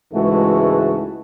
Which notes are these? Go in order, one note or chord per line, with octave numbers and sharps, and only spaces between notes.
C#2 G#2 E3 G#3 A3 F#4